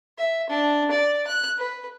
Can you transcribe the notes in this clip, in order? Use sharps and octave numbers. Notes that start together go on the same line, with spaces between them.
E5
D4
D5
F#6
B4